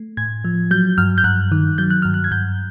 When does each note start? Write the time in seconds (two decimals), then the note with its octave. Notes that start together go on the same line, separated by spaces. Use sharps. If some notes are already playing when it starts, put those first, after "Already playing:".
Already playing: A3
0.17 A2 G#6
0.44 F3
0.71 F#3 G6
0.98 G2 F6
1.18 G6
1.24 G2 F#6
1.52 D#3
1.78 F#3 G6
1.90 F#6
2.02 G2 F6
2.14 F#6
2.24 G#6
2.31 G2 G6